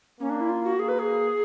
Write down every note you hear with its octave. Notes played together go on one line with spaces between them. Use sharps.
A#3 C#4
D4
E4
F4
F#4
A#3 G#4
B4
G#4